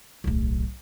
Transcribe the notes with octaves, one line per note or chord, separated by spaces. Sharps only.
D1 B1